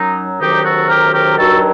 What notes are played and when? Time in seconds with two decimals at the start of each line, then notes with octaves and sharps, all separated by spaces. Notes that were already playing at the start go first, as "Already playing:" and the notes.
Already playing: F#2 F#3 D#4
0.40 D2 C3 D#3 F#3 D#4 G4
0.64 F#4 A4
0.88 G4 A#4
1.13 G4 A#4
1.37 G2 D#3 F#3 F#4 A4